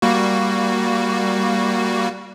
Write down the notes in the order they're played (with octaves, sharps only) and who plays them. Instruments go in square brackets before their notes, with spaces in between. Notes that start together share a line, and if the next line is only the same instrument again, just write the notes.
[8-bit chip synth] G3 A#3 F#4